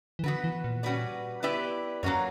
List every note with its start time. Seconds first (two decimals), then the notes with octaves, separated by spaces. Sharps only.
0.19 E3
0.24 D3 B3 F#4 B4
0.44 E3
0.64 A#2
0.83 G3 C#4 F#4 B4 D5
1.43 B3 E4 G4 B4 D5
2.03 F#2 F#3 A#3 C#4 F#4 C#5